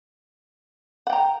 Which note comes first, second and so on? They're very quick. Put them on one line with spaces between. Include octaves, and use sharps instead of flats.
F#5 G5 A#5